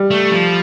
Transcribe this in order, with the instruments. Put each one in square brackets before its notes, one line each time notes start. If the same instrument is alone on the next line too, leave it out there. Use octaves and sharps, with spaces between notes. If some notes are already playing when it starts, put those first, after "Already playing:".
Already playing: [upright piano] G3
[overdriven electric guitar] A3
F3